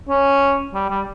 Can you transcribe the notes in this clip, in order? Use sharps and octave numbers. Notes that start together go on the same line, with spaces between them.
C#4
G3
G3